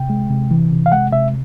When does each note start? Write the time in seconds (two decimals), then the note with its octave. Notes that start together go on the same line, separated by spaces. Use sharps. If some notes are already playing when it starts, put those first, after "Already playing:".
Already playing: C3 G5
0.10 G#3
0.30 C3
0.51 E3
0.71 C3
0.86 F5
0.92 G#3 F#5
1.12 C3 E5